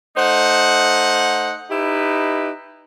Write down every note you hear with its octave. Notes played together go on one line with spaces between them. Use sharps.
A3 D#4 C5 F#5
D#4 E4 G4 B4